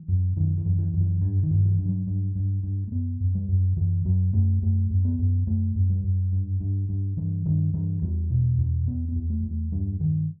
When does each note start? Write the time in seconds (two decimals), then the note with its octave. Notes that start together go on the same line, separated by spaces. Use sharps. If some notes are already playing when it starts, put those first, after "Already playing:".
Already playing: E3
0.08 F#2
0.36 F#2 D#3
0.58 E3
0.65 F#2
0.79 E3
0.93 F#2
1.00 E3
1.21 G2
1.43 D#3
1.50 G2
1.64 E3
1.78 G2
1.86 F#3
2.07 G2
2.35 G2
2.63 G2
2.88 A3
2.91 F#2 B3
3.20 F#2
3.35 G3
3.49 F#2
3.77 F#2 E3
4.05 F#2 F#3
4.33 F#2 A3
4.62 F#2 A3
4.90 F#2
5.05 B3
5.19 F#2
5.47 F#2 A3
5.75 F#2
5.90 G3
6.04 F#2
6.32 G2
6.60 G2
6.89 G2
7.17 G2 E3
7.46 G2 D#3
7.74 G2 E3
8.02 E2 G3
8.30 B2
8.59 E2
8.87 E2 B3
9.08 B3
9.16 E2
9.30 A3
9.44 E2
9.51 A3
9.72 G2 G3
10.00 G2 D#3